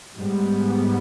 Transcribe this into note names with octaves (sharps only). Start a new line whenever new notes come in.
G#2 G3 B3